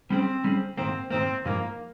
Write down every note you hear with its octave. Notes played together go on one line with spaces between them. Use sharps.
G3 C4 C#4 G#4
G3 C#4 G#4
G#2 D#3 A#3 C4
G#2 D#3 A#3 C4
G2 F3 G#3 A#3 D#4